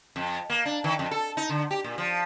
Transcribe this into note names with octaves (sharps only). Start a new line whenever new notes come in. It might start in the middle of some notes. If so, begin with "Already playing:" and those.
F2
A#3
D4
D#3
F2
A4
D#4
D3
G4
A#2
F3